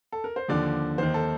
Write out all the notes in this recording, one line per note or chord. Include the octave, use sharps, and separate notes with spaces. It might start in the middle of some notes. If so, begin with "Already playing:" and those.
A4
A#4
C5
D#2 D3 F3 D5
D#2 D#3 C5
A4